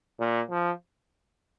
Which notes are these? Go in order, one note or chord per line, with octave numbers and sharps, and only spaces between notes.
A#2
F3